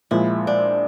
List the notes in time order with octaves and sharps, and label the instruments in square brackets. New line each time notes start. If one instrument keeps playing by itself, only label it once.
[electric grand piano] A#2 F3 G#3 [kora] E4
[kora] D4